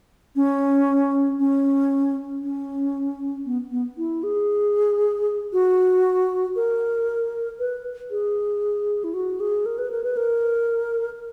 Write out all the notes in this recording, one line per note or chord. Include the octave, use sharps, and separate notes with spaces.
C#4
C#4
C#4
B3
B3
E4
G#4
F#4
A#4
B4
G#4
E4
F#4
G#4
A#4
B4
A#4
B4
A#4